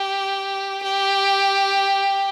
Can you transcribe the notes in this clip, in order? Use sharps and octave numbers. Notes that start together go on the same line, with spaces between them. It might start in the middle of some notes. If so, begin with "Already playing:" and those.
Already playing: G4
G4